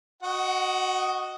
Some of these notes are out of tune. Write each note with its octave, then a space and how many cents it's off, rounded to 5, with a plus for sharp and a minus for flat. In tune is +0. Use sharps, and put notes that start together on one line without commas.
F#4 -5 D#5 +0 F#5 +30